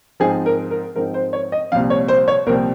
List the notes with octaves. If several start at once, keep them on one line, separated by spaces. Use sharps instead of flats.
G#2 F3 C4 D#4 G#4
A#4
A#4
G#2 F3 C4 D#4 A#4
C5
C#5
D#5
C2 A#2 F3 C4 F5
C#5
C5
C#5
C2 A#2 F3 C4 A#4